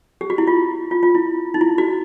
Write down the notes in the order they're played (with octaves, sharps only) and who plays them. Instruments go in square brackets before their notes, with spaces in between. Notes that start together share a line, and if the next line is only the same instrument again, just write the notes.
[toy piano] G4
F#4
E4
F4
F4
F4
E4
D#4
E4
F#4